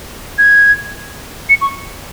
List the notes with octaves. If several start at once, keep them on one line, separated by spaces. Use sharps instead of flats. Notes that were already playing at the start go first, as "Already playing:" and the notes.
G#6
C#7
C#6